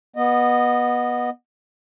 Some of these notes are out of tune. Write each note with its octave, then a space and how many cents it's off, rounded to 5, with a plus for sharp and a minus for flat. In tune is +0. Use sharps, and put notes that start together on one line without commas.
B3 -20 D#5 -15